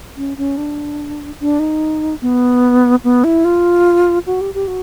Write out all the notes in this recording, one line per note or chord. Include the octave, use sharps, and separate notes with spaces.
C#4
C#4
D4
D4
D#4
B3
B3
E4
F4
F#4
G4
G4
F#4